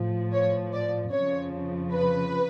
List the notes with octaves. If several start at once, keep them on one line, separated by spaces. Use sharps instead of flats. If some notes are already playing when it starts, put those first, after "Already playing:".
Already playing: A2 F3
C#5
D5
F2 C#3 F3 C#5
B4